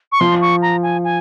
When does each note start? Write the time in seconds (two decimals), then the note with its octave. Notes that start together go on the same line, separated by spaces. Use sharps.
0.12 C#6
0.20 F3 C6
0.41 C#6
0.62 A#5
0.83 G#5
1.04 G#5